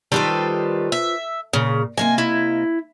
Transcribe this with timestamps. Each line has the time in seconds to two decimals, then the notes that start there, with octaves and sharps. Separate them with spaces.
0.12 D#3 G3 F4 A4 B4 C5
0.92 E5
1.53 A#2 C#3
1.97 C3 A#3 D#5 G#5
2.18 E4